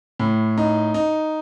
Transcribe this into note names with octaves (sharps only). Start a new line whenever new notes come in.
A2
D#4
D#4